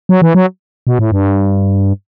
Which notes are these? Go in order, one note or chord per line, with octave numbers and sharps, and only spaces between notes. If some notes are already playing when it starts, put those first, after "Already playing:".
F#3
E3
F#3
B2
A2
G2